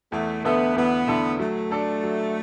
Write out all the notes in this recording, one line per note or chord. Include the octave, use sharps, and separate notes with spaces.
E2 A3
D3 A3 B3 E4 A4
E2 B3
D3 A3 E4 A4
F#3 A3
D4 A4 D5
F#3